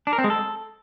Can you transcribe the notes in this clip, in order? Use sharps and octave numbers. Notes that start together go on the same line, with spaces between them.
D4
A#4
C4
G#3
A4